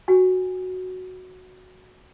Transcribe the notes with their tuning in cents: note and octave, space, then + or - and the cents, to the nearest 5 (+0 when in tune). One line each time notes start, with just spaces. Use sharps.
F#4 -5 G#5 -20